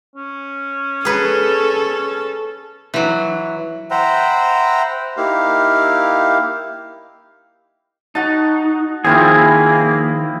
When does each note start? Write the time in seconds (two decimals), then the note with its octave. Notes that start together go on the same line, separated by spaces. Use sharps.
0.16 C#4
1.05 G#4 A4 B4
2.94 E3 F#3
3.91 C5 E5 F#5 G5 A#5 B5
5.17 A#3 D#4 E4 G4 F5
8.15 D#4 F#4 F#5 A5
9.05 D#3 F3 A#3 C4 E4 F4 G#4